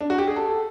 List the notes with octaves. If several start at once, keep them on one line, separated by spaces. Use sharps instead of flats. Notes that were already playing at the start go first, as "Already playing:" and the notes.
D4
F#4
G4
G#4
A4